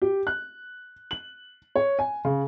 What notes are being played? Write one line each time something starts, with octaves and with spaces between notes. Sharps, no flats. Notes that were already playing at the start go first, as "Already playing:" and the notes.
G4
F#6
F#7
C#5
G#5
C#3